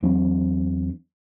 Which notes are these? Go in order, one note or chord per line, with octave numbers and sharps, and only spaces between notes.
E2 F#3 C4 D4